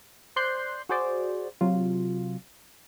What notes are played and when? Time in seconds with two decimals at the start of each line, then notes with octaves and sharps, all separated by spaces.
0.36 C5 D5 C6 F#6 G6 C7
0.89 F#4 G#4 C5 D5
1.61 C3 F#3 F4